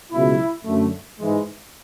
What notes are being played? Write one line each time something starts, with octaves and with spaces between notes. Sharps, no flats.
C#2 B2 F#3 E4
F#2 D3 A3
G#2 E3 G#3